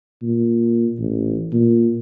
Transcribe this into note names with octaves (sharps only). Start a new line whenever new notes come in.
A#2
A1
A#2